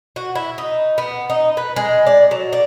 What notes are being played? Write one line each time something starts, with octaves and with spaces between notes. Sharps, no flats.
F#4
E4
D#4
B3
D#4
B4
G#3
D5
F#3
D5